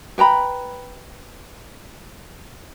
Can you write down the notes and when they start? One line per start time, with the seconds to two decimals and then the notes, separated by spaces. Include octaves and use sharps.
0.18 B4 G5 A#5 B5